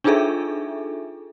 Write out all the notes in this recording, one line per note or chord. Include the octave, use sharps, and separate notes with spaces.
D4 D#4 F4 G#4 A4 E5